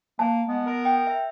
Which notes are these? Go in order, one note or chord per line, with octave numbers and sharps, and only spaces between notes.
A#3 A5
G#3 B3
A#4
G5
E5